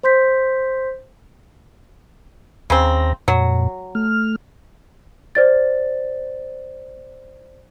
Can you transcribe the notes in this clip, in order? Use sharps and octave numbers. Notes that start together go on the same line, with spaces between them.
C5 C6 G6 B6
D#2 C#3 C4 A#5
F2 A#2 F#3
A3 F6
C5 D5 A6